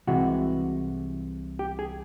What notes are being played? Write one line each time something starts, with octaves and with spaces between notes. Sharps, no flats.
C2 C3 E3 G#3 F#4
G4
G#4